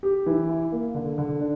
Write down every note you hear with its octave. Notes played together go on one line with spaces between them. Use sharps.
G4
E3
E4
A#3
D3
D3
D4